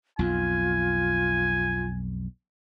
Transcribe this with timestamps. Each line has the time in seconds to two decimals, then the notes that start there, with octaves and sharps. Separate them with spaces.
0.19 B1 F2 F4 G#5